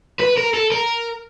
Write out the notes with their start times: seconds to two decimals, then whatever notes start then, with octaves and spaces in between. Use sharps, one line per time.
0.20 B4
0.38 A#4
0.54 A4
0.72 A#4